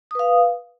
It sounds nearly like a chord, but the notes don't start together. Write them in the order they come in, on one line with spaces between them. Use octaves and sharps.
D#6 B4 F5